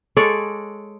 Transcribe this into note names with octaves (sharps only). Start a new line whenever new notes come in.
G#3 A4 C#5 D5